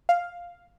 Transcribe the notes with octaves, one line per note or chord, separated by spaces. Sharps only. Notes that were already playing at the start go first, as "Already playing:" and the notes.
F5